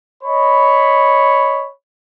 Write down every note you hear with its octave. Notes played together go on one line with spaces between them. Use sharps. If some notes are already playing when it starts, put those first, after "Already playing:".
C#5 D#5 B5